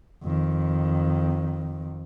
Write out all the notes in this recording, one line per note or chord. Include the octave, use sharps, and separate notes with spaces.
F2 D#3